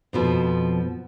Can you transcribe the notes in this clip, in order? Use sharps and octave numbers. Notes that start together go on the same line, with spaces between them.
F2 B2 F3